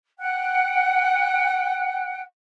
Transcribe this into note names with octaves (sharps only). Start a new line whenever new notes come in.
F#5 G5 F#6